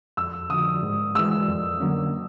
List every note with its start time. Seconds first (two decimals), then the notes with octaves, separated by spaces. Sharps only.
0.17 F2 E6
0.50 D3 F3 D#6
0.83 G#2
1.15 E3 G#3 E6
1.48 F2
1.80 D3 F#3 A#3 C#4